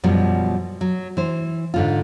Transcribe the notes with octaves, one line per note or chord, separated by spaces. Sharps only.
F#2 B2 F3 G3
F#3
E3 C5
G#2 D3 F4